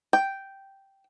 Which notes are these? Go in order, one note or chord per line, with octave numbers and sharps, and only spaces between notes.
G5